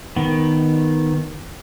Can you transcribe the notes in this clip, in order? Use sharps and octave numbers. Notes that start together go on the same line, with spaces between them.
D#3 B3